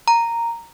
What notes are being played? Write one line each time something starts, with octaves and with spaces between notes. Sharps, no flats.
A#5